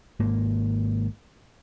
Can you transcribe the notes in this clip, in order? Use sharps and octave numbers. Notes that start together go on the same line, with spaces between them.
G#1 G#2 A#3